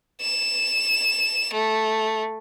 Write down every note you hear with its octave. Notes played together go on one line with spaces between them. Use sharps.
E7
A3